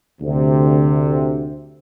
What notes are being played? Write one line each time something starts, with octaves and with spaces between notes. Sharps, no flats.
D2 C3